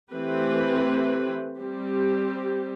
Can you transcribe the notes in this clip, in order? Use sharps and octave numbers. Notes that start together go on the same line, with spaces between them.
E3 A3 C4 G4 B4
G3 C4 G4